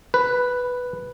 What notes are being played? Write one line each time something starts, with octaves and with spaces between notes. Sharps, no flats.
B4